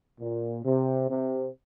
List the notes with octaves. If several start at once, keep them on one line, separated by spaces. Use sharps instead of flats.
A#2
C3
C3